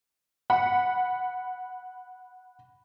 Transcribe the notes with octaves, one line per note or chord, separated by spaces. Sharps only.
F#5 B5